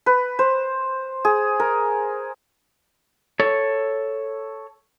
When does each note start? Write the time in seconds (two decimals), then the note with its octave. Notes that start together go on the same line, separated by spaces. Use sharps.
0.06 B4
0.39 C5
1.25 G#4
1.60 A#4
3.40 A4 C#5